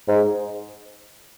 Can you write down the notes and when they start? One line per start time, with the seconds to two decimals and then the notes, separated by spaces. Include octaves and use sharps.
0.08 G#2